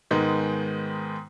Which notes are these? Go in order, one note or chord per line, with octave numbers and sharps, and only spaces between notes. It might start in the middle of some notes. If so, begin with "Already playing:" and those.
G#2 D#3 G#3 B3 D#4